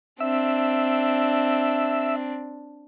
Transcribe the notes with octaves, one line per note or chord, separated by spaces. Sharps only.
C4 D4 E5